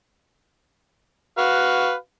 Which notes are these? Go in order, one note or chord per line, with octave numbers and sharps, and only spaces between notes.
F#4 B4 F5